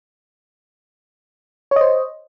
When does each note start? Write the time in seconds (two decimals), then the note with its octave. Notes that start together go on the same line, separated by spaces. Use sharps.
1.71 C#5
1.76 D#5
1.81 C5